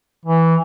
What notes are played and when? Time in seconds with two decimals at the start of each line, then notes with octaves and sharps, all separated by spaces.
0.25 E3